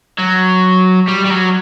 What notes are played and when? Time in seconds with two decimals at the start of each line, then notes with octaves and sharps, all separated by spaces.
0.18 F#3
1.07 G3
1.24 G3
1.30 F#3